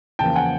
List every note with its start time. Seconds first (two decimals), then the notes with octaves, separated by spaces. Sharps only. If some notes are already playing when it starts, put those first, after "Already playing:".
0.19 E2 C#3 F3 A#3 G5 A5
0.36 F#5 G#5